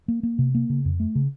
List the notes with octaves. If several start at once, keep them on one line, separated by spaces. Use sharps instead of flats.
A#3
A#3
C3
A#3
C#3
F2
A3
C#3